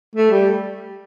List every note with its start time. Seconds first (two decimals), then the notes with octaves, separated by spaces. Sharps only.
0.16 A3
0.32 G3